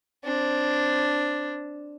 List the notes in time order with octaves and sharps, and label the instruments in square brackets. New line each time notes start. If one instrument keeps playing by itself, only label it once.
[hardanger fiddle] C4 D4